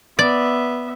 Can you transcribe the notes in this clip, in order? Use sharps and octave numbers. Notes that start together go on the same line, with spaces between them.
B3 D5 E5